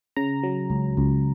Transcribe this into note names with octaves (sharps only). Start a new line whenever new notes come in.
C#3 A#5
F#3
C#2
C#2